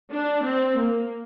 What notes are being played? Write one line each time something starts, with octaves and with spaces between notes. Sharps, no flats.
D4
C4
A#3